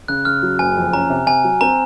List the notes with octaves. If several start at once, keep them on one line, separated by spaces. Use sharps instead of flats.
C#3 F#6
C#3 F6
F#3
F#1 G#5
F2
C#4 A#5
C3
C3 G#5
F#3
C4 A#5